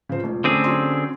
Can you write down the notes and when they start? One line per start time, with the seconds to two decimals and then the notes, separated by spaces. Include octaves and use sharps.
0.09 C#3 F3 C5
0.24 E1 A#2
0.44 D3 A3 C4 C#4 G#4
0.64 F#3 C#4 C6